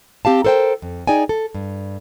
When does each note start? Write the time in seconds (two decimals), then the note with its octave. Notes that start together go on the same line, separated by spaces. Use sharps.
0.25 C4 G4 F5 A5
0.45 A4 A#4 C5 F#5 G5
0.82 F2
1.07 D#4 G#4 D5 G5 G#5
1.29 A4
1.55 G2